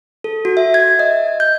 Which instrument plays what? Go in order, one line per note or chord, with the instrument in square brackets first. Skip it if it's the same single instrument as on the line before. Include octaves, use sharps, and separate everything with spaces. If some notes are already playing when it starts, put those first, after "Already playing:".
[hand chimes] A4
F#4
E5
G#6
D#5
G6